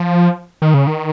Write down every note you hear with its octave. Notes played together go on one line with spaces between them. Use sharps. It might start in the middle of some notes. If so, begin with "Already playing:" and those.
Already playing: F3
D#3
C#3
D#3